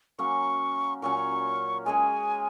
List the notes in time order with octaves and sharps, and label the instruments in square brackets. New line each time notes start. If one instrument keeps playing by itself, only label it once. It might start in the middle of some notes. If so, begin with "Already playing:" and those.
[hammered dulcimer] F#3 A#3 C#4 [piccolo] C#6
[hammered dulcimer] A#2 F#3 C#4 [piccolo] C#6
[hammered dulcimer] G#3 C#4 G#4 [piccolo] G#5